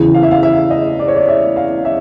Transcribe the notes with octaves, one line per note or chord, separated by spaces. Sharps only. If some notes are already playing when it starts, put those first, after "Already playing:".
Already playing: E2 C#3 E3
F5
E5
F5
E5
D#5
D5
C#5
D5
E5
F5
E5